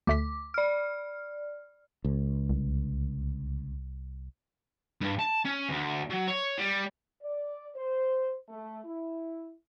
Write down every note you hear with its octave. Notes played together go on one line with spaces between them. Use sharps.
D2 A3 D6 B6
D5 F6
C#2
C2
G2
A5
C#4
D2
F#3
C#5
G3
D5
C5
A3
E4